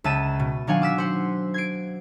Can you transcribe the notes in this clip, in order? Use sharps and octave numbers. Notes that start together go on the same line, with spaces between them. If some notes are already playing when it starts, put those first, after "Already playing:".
C#2 E5 A5 D#7 E7
B2
D#3 F#3 D4 F5 F#5 G#5
D6 E6 B6
C5 F#5
G#6 C7 D7